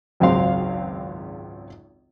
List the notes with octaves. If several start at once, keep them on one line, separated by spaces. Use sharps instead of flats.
G#1 C#2 F#2 C4 F5 C6